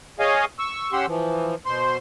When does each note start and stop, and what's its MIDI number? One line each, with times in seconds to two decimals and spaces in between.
0.19 0.45 68
0.19 0.45 73
0.19 0.45 75
0.19 0.45 77
0.19 0.45 80
0.59 0.92 85
0.59 0.92 88
0.92 1.06 61
0.92 1.06 67
0.92 1.06 78
0.92 1.06 84
0.92 1.06 88
1.07 1.55 52
1.07 1.55 53
1.66 1.97 47
1.66 1.97 72
1.66 1.97 84